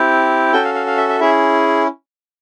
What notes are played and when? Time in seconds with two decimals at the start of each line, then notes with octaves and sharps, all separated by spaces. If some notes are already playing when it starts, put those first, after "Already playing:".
Already playing: C4 E4 G4
0.53 C#4 F#4 A4 G5
0.64 F5
0.75 F5
0.87 F5
0.97 E5
1.09 E5
1.20 C#4 E4 G#4 E5